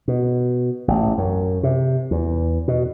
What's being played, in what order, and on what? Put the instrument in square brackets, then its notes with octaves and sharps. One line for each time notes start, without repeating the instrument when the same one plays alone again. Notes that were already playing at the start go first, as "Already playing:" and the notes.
[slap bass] B2
A1
F#2
C3
E2
B2